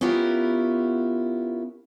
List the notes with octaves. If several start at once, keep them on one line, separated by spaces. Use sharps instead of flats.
B3 C#4 E4 F4 G4 A#4